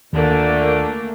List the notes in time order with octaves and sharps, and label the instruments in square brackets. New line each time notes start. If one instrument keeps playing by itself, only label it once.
[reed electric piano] D#2 [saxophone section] A#2 D3 D4 [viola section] A3 A#3